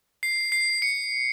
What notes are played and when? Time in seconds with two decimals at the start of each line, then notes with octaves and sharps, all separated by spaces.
0.23 C7
0.52 C7
0.82 C#7